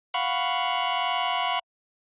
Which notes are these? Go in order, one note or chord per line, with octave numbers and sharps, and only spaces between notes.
F5 F#5 B5 C#6